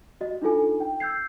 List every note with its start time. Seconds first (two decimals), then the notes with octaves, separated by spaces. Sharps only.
0.21 F#4 D#5
0.42 D4 D#4 F4 A4 G#5
0.80 G5
1.00 E6 G6 G#6 C7